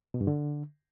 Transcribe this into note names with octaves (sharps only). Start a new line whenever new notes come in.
B2
G2
D3